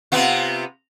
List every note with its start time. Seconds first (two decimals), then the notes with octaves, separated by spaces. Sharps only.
0.12 C3 B3 F4